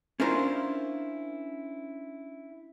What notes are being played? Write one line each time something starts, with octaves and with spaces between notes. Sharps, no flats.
C#4 D4 E4 F4 A#4 C5